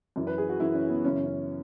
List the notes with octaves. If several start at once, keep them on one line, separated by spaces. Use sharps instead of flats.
F#2 E3
B4
G#4
F#4
F#2 E3 E4
C#4
B3
F#2 C#3 E3 C#4
C#4